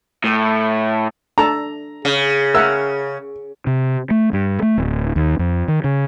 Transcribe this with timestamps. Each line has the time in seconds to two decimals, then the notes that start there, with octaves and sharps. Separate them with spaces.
0.24 A2
1.38 D4 A4 A5 A#5
2.05 C#3 G#4
2.54 A#4 E5 F#5 E6
3.67 C3
4.11 A3
4.33 G2
4.63 A3
4.78 D1
5.16 D#2
5.39 F2
5.68 D#3
5.84 C#3